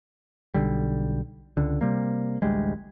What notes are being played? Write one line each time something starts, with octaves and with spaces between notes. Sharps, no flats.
B1 D3 G3
C#2 D3
C3 G3 A#3
A1 D2 G3 G#3